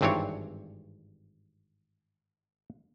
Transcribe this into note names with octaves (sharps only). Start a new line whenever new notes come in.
G#1 G2 E3 C4 D4 C#5